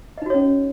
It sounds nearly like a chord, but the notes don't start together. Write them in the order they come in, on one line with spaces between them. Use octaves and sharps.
D#5 D#4 F#4 C#5 C#4